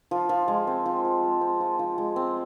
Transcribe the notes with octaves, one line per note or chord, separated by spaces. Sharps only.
F3
F3
G#3
C4
F3
F3
G#3
C4
F3
F3
G#3
C4